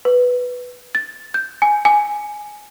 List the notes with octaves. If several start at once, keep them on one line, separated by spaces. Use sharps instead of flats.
B4
A6
G6
G#5
G#5